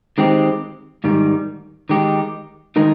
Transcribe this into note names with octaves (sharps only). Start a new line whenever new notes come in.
D#3 G#3 C4 G4
G#2 D#3 G3
D#3 G#3 D#4 G4
D#3 G#3 D#4 A#4